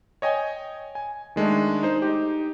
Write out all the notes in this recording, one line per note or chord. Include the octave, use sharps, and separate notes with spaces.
C#5 D#5 G5 G#5
G#5
D#3 G#3 A3 D4
D#4 C5
D#4 G4